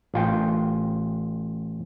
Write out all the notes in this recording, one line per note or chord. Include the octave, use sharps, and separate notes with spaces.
A1 F4 G5